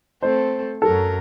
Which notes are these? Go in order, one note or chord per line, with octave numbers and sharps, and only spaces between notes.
A3 C4 A4 C5
F#2 F#3 A4 A#4